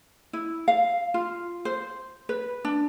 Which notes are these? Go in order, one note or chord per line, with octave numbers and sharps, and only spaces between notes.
E4
F5
F4
C5
B4
D4